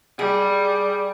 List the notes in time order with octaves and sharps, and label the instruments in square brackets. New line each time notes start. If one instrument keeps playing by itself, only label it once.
[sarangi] G3 [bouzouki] G#4